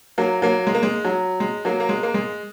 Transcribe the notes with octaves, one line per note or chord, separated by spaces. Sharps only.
F#3 A#3
F#3 A#3
G#3
A#3
G#3
F#3
G#3
F#3 A#3
A#3
G#3
A#3
G#3